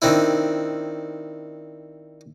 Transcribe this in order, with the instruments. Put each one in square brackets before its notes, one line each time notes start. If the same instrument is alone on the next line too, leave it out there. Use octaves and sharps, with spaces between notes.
[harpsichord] D#3 C4 D4 E4